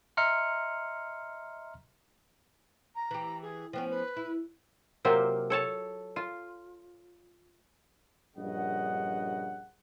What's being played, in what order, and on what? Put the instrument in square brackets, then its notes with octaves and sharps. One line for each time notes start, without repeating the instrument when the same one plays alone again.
[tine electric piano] D#5 E5 A#5 C6 F6 C#7
[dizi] A#5
[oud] E3 G4
[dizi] G#4
[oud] F3 B3 C#4 [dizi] G5
[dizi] B4
[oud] E4
[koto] C3 F#3 A#3 C4 F4 G4
A4 C#5 A5
F4
[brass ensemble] A#1 G2 C#3 D#5 F#5